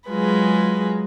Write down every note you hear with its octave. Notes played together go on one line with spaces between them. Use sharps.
F#3 G#3 F4 G#4 B4